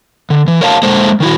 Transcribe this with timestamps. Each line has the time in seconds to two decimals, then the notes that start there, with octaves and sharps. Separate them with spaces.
0.30 D3
0.48 E3
0.61 A#4 C#5 F5 A5
0.83 G#3 A#3 A4 C5
1.20 D#3 E4 F#4